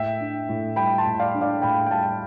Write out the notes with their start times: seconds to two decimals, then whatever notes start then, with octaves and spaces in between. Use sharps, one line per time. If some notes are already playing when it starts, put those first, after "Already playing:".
Already playing: A2 E5 G5
0.20 D4
0.49 A2
0.76 G3 G5 B5
0.98 A5 C6
1.06 A2
1.20 D5 F5
1.34 D4
1.41 D5 F5
1.62 A2 G5 B5
1.86 G5
1.91 G3 F5 A5